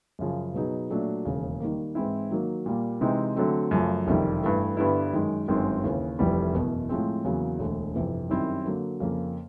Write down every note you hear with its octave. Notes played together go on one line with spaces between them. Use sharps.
F#2 C#3 F3
B2 F#3 B3 D#4 G#4
A#2 F#3 A3 D4
E1 D#2 C#3
D#3 G3 A#3
G#2 E3 G#3 C4 E4
D#3 F#3 A#3
A#2 G3 A#3
C3 E3 G#3 C4 D#4
D3 F#3 A3 C4
F#2 C#3 F3 A3
F#1 F2 C3 D#3 G3
G2 E3 A3
G2 D3 G3 B3 E4
F#2 D#3 G#3
G1 F#2 D#3 G#3 C4
D#2 C#3 E3
F1 F2 C3 E3 G3
F#1 E2 B2
A2 F3 G#3 C4
E2 C#3 F#3 A#3
E1 D2 D3
G1 F2 C3 E3
F#2 D#3 G3 C4 E4
D3 F#3 A#3
F2 C#3 F3 A#3